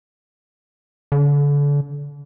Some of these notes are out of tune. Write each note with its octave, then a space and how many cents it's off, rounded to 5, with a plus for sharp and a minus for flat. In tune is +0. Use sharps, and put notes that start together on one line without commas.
D3 -35